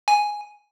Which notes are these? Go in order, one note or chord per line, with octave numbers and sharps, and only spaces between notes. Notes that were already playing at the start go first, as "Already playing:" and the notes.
G#5